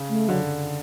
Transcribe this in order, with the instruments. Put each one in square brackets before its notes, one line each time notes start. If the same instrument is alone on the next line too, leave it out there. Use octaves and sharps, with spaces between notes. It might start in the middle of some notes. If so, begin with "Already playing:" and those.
Already playing: [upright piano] C#3
[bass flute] A3
[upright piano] D3 [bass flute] F#3